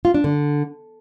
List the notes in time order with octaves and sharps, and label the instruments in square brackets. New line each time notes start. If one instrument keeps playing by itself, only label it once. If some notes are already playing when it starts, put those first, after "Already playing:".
[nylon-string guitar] F4
D4
D3